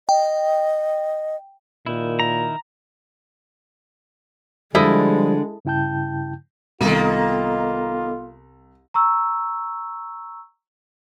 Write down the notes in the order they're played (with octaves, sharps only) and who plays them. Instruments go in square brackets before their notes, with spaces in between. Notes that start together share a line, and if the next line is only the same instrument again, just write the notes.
[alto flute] D#5 [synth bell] G5
[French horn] A#2 [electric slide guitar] D#3 E4
[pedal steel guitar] A#5
[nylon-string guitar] D3 [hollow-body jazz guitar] F3 G3 [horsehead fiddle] G#3 [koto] E4 D#5
[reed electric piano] G2 C#3 E4 G5 A5 G6
[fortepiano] C2 [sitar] D#3 A#3 [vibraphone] B3 A4 [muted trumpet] F4
[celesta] A#5 C#6 E6